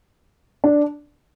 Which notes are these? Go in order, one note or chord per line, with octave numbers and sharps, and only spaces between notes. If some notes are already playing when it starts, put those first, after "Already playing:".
D4